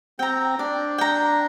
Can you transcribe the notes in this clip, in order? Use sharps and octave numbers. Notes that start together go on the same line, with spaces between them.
C4 G5 A#5
D4 D5
G5 A#5